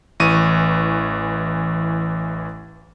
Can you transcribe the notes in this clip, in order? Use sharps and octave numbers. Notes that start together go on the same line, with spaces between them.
A1 E3 C#6 D#7